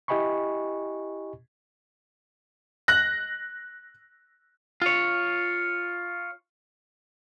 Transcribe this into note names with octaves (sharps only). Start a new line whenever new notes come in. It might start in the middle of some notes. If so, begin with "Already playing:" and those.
E4 G4 D#5 G#5 B5 C#6
F#6 A#6
F4 C#5